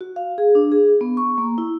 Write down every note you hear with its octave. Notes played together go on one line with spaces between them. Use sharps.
F#4
F5
G#4
D4
G#4
B3
C#6
A#3
E4